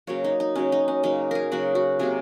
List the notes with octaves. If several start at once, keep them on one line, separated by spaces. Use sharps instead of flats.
C#3 F#3 A#3 C#5
D#4
D#4
C#3 F#3 A#3 C#4
D#4
C#4
C#3 F#3 A#3 D#4
G#4 A#4
C#3 F#3 A#3 F#4
F#4
C3 F#3 A#3 G#4